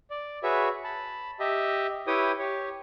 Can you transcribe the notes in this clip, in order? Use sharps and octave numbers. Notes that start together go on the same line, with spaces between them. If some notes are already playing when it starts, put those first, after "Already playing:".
D5
F#4 G#4 B4 C#5 E5
A5 B5
G4 D#5 E5
E4 G4 B4 C#5 G5 D#6
G4 C#5